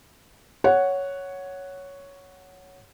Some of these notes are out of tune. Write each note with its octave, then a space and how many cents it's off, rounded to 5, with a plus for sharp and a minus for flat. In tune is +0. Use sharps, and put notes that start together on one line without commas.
C#5 +5 F#5 +0